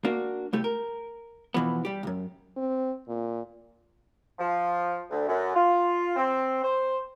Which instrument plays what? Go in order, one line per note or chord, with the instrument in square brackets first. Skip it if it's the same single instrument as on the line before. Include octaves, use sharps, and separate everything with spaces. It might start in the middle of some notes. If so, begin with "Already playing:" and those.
[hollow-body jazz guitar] A#3 D4 F#4
C2 A3 G4
A#4
B2 E3 F3 B3
G3 G4
C2 F#2
[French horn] C4
A#2
[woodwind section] F3
D2
F#2
F4
C4
C5